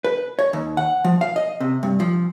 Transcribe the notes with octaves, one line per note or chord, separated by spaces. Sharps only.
B4
C#5
D#2
F#5
F3
F5
D#5
C3
G2
F3